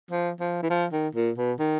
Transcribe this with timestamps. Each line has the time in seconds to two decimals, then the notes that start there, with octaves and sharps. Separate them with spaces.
0.11 F3
0.40 F3
0.62 E3
0.70 F3
0.92 D#3
1.15 A#2
1.37 B2
1.60 D#3